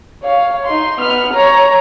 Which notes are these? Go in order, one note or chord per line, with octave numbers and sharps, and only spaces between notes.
C#5 F5
D#4 C6
B3 F6
C#5 A#5